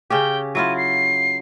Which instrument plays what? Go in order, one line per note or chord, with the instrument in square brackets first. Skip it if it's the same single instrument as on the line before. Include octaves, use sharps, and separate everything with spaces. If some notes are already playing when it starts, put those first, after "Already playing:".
[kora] C#3 C#4 G4 [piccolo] G5
[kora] F#3 E4 F4 [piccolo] D#7
[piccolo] C7